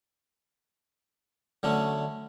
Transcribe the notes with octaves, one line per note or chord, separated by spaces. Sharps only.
D3 F#3 A3 C#4